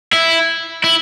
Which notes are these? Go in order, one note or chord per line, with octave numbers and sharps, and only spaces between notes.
E4
E4